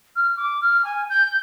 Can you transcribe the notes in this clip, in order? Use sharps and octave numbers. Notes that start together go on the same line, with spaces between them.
F6
D6
F6
G#5
G6